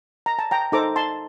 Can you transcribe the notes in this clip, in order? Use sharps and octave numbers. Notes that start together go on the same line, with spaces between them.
A#5
A5
G5 A#5
D#4 A4 C5 A#5 D6
A5 C6